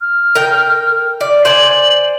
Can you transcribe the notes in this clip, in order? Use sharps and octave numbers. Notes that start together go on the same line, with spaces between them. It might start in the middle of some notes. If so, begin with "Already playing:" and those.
F6
A#4 G5
D5
C5 D5 G#5 F#7